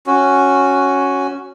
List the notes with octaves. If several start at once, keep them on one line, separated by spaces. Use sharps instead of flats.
C#4 F#4